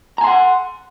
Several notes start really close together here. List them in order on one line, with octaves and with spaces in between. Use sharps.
A#5 G#5 C6 F#5